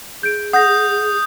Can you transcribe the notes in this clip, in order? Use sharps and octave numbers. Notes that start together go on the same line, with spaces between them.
G#4 G6 D7
F#5 D#6 G6 A#6